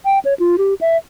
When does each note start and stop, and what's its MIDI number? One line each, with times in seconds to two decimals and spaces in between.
0.05 0.19 79
0.25 0.34 73
0.39 0.56 65
0.58 0.74 67
0.81 0.97 76